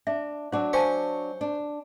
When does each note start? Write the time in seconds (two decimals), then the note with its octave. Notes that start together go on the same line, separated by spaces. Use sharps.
0.07 D4 E5
0.52 F#3 D4 F#4 C5 D6
0.73 C5 F5 G#5 A5 C#6
1.41 D4